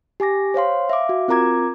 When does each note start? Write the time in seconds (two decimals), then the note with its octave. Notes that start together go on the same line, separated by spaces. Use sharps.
0.20 G4 G#5 D6 A#6
0.54 C5 C#5 F5 C6
0.89 E5 F5 D6
1.09 F#4
1.28 C4 F4 A#4 A#5 D6 G#6